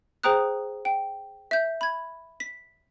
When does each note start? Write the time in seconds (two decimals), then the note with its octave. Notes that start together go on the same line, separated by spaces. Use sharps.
0.23 G#4 C5 G5 A#5 D#6 F#6
0.85 G5
1.51 E5 G6
1.81 B5 G#6
2.40 B6